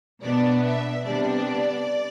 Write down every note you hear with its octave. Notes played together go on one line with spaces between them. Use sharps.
B2 B3 D4 D5
E5
C3 G3 B3 D4 D5